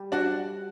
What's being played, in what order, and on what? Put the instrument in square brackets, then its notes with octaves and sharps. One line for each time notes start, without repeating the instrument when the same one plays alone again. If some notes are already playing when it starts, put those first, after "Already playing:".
Already playing: [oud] G3
[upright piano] D4 F#4